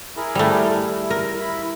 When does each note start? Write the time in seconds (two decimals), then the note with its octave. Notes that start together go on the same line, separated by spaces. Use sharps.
0.16 E4 G#4 A#4
0.35 G3 A3
0.76 E4
1.10 A#4
1.39 E4 B5